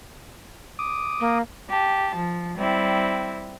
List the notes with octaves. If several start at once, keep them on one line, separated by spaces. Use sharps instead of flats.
D6 D#6
A#3
G4 A5
F3
G3 C4 E4